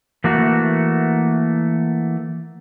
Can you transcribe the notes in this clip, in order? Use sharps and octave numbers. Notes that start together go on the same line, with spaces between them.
E3 A3 A#3 F#4